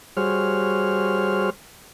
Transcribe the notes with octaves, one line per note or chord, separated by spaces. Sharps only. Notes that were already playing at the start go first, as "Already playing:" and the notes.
G3 F#4 G#4 C5 C#5 F6